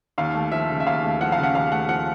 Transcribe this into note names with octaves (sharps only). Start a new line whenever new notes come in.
D#2 F5
A3
F3 E5
C#3
E5
D#2 F5
A3
F3 F#5
F5
C#3
F#5
D#2 F5
A3 F#5
F3 F#5